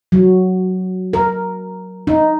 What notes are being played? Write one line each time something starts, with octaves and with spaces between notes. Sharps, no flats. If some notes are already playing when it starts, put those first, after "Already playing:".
F#3
A#4
D#4